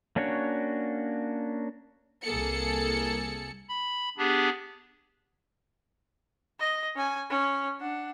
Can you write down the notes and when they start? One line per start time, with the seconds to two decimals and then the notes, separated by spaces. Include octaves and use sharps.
0.16 A#3 C#4 D4 F#4 C#5
2.25 C2 A#3 G#4 A4 C#7
3.69 B5
4.18 B3 D4 G4 G#4
6.59 D#5
6.95 C#4 G#5
7.30 C#4
7.80 D4 F#5